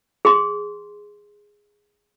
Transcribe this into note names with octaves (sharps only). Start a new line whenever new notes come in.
G#4 C6